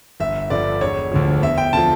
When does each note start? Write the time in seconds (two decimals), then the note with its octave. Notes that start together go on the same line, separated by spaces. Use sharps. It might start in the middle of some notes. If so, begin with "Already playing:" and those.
0.20 G1 E5
0.50 G2 D3 F3 D5
0.81 E1 C#5
1.12 D2 D3 F3
1.42 E2 E5
1.58 G5
1.73 D3 F3 A5